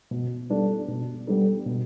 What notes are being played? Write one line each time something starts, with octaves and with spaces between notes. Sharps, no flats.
B2
G3 B3 D4 A4
B2
G3 B3 D4 A4
B2